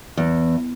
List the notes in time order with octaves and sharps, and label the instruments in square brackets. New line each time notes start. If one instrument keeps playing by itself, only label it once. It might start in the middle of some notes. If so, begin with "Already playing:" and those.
[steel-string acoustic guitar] E2